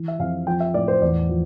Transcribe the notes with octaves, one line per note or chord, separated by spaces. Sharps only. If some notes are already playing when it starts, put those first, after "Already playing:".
Already playing: E3
E5
F2 F5
F3 G5
E5
A2 D5
C5
E2 D5
F3